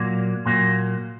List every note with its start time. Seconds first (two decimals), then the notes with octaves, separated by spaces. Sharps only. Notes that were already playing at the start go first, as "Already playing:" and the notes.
Already playing: A#2 F#3 A#3
0.46 A#2 F#3 A#3